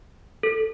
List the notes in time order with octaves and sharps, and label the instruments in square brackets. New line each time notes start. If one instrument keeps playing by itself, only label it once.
[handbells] A4